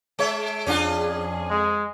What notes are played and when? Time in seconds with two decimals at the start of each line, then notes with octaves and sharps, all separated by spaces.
0.19 G#3 C#5 E5
0.66 F2 C#4 D4 F4 G#4
1.50 G#3